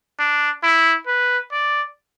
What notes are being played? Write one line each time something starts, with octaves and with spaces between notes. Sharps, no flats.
D4
E4
B4
D5